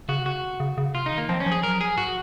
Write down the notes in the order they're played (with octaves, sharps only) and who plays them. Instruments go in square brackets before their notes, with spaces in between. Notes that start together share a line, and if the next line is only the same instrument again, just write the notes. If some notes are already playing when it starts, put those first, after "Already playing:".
[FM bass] C#3 [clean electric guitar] F#4
[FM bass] C3
[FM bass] C#3 [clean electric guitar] F#4
[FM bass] C#3
C#3
[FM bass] C3 [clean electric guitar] F4
[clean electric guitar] D#4
[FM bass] D#3
[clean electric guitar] A#3
[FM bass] F3 [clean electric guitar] C4
[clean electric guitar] C#4
[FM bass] F3
[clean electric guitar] G#4
[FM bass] F#3 [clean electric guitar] A#4
[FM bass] F3 [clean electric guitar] G#4
[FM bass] G#2 [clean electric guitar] F#4